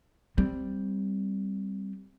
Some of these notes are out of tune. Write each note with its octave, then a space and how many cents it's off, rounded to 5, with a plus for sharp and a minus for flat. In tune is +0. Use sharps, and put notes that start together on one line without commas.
G3 +0 C4 +0